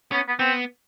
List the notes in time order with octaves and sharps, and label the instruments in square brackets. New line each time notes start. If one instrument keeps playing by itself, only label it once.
[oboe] B3 [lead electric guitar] C#4
[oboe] B3
[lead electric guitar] B3 [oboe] C4